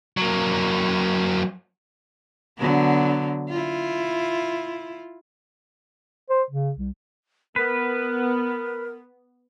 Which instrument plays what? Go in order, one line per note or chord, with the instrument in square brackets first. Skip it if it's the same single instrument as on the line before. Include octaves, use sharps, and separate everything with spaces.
[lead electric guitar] F#3 A#3
[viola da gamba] D3 F#3 B3
E4 F4
[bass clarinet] C5
C#3
C2
[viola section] B3 [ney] A#4 [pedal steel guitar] B4